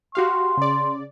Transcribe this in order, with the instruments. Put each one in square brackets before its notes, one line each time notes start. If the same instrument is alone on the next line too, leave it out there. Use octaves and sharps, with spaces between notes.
[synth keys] F#4 G4 F5 [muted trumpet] C6
[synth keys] C#3 D5